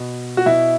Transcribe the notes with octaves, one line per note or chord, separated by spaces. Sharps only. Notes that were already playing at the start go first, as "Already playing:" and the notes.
Already playing: B2
F#4
B2 E4